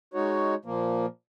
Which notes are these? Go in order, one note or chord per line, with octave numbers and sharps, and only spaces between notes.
G#3 D#4 F#4 C#5
A#2 F3 A#3